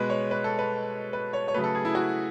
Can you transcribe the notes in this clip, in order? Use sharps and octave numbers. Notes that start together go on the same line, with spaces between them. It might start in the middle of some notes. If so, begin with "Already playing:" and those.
Already playing: B2 G#3 B4
C#5
B4
A4
B4
B4
C#5
C#5
C#3 F#3 A3 B4
A4
G#4
E4
F#4